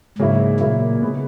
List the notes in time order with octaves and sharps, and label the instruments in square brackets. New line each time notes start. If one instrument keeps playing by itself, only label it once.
[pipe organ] G#2 [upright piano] C#3 F#3 A#3 E4
[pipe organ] A#2 [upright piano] C#3 F#3 A#3 E4
[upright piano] C#3 G#3 B3